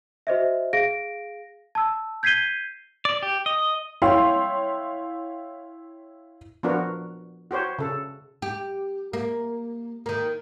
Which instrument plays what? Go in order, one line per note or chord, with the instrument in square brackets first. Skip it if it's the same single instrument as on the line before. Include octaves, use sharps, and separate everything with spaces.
[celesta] F#4 C5 D#5 E5
G#4 F5 A#6 D7
A5 E6
G6 G#6 B6 C7 D#7 G7
[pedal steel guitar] D5
G4
D#5
[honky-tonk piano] E4 C#5 F5 G5 C6
[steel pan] F3 B3 D4 F#4 A#4
F#4 G4 C5 C#5
C#3 A4
[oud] G4
A#3
D#3 A#3